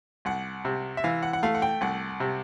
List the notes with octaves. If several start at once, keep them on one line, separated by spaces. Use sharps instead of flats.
C2 F#5
C3
E5
E3 F5
F#5
F#5
A3 F5
F#5
G5
C2 F#5
C3